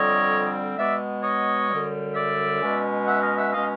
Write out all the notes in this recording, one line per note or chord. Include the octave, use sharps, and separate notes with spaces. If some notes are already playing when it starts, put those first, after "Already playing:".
Already playing: F2 D3 G3 C4 C#5 D#5
B2 G#3 B3 D5 E5
C#5 D#5
F#2 D3 G3
D5 E5
B2 G#3 C#4
E5 F#5
D#5 F5
E5 F#5
B2 G#3 C#4 D#5 F5